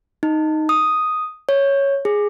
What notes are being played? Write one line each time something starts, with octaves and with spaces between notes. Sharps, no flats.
D#4
D#6
C#5
G#4